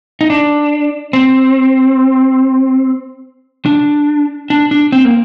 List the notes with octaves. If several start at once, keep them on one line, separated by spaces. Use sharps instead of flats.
D#4
D4
C4
D4
D4
D4
C4
A#3